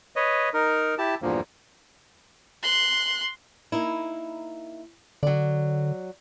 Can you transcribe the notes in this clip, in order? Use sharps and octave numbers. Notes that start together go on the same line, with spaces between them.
B4 C#5 D#5
D#4 A#4
E4 G4 A5
E2 G2 A#2 D3 F3 A#3
C6 F#6
A#3 D#4 E4
D3 F#3 D5